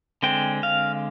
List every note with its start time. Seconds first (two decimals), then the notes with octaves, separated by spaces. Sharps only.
0.23 D3 G#3 C4 G5
0.63 F5